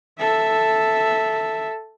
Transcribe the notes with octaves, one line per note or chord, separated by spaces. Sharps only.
A4 E5